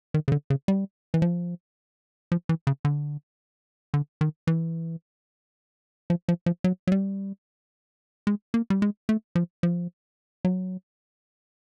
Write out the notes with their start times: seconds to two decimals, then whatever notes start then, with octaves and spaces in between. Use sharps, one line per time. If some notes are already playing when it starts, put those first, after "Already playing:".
0.14 D#3
0.28 C#3
0.32 D3
0.50 C#3
0.68 G3
1.14 E3
1.22 F3
2.32 F3
2.49 E3
2.67 C#3
2.85 D3
3.94 D3
4.21 D#3
4.47 E3
6.10 F3
6.29 F3
6.46 F3
6.64 F#3
6.87 F#3
6.92 G3
8.27 G#3
8.54 A#3
8.70 G3
8.82 G#3
9.09 A3
9.35 F3
9.63 F3
10.45 F#3